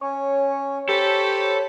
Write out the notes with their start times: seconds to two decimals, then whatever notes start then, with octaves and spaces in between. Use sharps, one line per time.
0.01 C#4 C#5
0.89 G4 A4 C5 B5 C#6